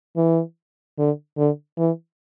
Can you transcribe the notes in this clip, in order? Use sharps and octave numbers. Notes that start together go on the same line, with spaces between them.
E3
D3
D3
E3